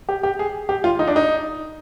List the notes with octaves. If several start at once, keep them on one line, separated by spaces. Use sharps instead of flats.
G4
G4
G#4
G4
F4
D#4
D4
D#4